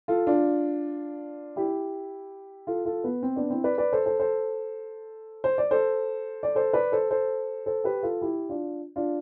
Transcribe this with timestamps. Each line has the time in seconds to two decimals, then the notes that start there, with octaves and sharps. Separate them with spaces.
0.08 F4 A4
0.27 D4 F4
1.56 E4 G4
2.67 F4 A4
2.85 F4 A4
3.04 B3
3.23 C4
3.36 B3 D4
3.50 C4 E4
3.64 B4 D5
3.78 B4 D5
3.93 A4 C5
4.06 A4 C5
4.20 A4 C5
5.44 C5
5.58 D5
5.71 A4 C5
6.43 D5
6.55 A4 C5
6.73 B4 D5
6.92 A4 C5
7.11 A4 C5
7.66 A4 C5
7.84 G4 B4
8.03 F4 A4
8.22 E4 G4
8.49 D4 F4
8.96 D4 F4